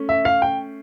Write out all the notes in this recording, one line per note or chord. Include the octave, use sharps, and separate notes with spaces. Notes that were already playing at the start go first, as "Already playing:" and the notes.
Already playing: A3 C#4
E5
F5
G5